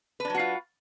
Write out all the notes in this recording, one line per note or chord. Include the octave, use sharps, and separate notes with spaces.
F#3 D4 F4 F#4 B4